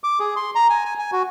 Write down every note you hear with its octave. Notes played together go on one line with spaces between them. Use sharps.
D6
G#4
C6
A#5
G#5
G#5
G#5
F#4